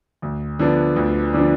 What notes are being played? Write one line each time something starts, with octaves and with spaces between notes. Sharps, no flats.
D2
D3 F3 B3 D4
D2
D3 F3 B3 D4